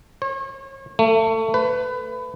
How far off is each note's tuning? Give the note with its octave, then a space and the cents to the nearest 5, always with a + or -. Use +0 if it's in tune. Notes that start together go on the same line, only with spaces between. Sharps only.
C#5 -35
A3 +30
B4 +25